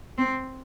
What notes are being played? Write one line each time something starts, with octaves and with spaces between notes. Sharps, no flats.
C4